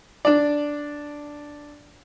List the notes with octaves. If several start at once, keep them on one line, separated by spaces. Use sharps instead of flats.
D4 D5